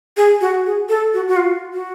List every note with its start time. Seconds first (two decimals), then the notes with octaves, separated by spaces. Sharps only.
0.17 G#4
0.41 F#4
0.66 G#4
0.89 A4
1.14 F#4
1.28 F#4
1.36 F4
1.73 F#4